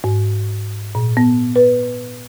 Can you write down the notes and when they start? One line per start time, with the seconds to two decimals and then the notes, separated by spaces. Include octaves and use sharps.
0.04 G#2
0.95 A#2
1.17 B3
1.56 B4